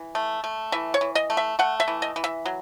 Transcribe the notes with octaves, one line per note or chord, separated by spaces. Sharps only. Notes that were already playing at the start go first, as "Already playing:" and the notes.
Already playing: E3
A3
A3
E3 E5
C#5
E3
D#5
A3
E5
A3 F#5
E5
E3
D#5
E3
E5
F#3